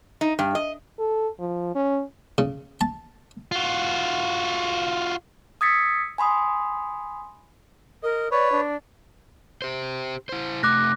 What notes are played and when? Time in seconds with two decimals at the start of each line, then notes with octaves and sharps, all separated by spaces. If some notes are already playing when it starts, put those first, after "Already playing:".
0.21 D#4
0.39 G2
0.55 D#5
0.99 A4
1.39 F3
1.75 C#4
2.38 C#3
2.81 A5
3.52 F4 F#4
5.61 D#6 E6 G#6 A6 B6 C#7
6.18 G#5 B5 C6 D#6
8.03 A#4 D#5
8.31 B4 C#5 D5
8.52 D4
9.62 G4 C5
10.29 E4 C5
10.63 C3 A3 D6 F#6 A#6